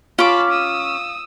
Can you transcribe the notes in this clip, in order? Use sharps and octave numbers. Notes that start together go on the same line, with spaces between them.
C#4 F4 A5 B5 D6
D#6 E6